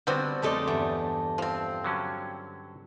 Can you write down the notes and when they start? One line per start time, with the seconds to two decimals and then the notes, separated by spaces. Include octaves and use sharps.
0.07 D3 G3 B3 C4 F#4
0.42 F2 G#3 A3 D#4 A4 D5
0.68 E2 G2
1.38 F3 C4
1.84 D3 F#3 C#4